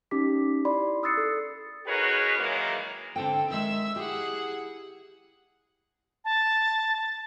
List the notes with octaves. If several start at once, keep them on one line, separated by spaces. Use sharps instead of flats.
C#4 D#4 G4 D6 B6
E4 D5 B5 C6
D#6 E6 F#6 A6 C7 C#7
A4
D#4 F#4 G#4 A#4 B4 C#5
D#3 E3 F#3 G#3 A#3
D3 C4 A4 G5
D#3 G#3 E5 E6
E4 G4 G#4 F#5
A5